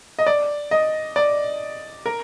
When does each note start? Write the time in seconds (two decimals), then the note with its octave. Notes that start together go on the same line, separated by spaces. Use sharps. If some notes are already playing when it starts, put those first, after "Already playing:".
0.19 D#5
0.27 D5
0.71 D#5
1.16 D5
2.06 A#4